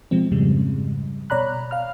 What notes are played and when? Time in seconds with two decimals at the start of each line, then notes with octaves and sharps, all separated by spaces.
0.11 B2 F3 G#3 C4
0.32 F2 G#2 C#3 G3 G#3
1.30 B2 C#5 D5 A#5 B5 F#6
1.71 F5 F6